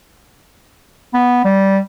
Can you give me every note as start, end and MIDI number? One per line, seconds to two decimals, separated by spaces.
1.14 1.43 59
1.45 1.79 55